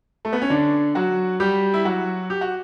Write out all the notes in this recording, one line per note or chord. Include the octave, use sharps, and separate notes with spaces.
A3
B3
C#4
D3 D4
F#3 F#4
G3 G4
E4
F#3 F#4
G4
F#4